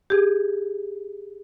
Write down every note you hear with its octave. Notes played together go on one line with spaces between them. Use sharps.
G4 G#4